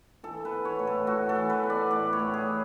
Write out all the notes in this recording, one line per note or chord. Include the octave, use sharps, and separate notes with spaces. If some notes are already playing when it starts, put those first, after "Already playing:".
E3 A4
B4
B3
C#5
A2
A4
A2 F#4
A4
E3
B4
B3
D5
A2 D5
C#5
A2
G#4
E3